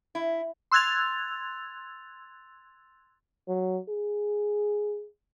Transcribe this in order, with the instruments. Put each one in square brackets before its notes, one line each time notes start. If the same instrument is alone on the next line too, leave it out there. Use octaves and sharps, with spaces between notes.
[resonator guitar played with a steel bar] E4
[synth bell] C6 E6 F#6 G#6 A6 F7
[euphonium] F#3
G#4